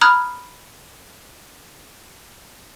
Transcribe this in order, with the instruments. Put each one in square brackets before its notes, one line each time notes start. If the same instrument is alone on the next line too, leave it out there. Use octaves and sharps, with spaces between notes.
[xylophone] A#5 B5 D#6 F6 F#6 G#6